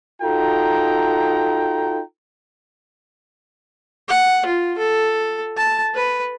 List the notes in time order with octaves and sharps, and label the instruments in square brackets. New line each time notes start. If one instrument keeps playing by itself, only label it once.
[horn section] D#4 F4 F#4 A4 G5 A#5
[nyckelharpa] F#5
F4
A4
A5
B4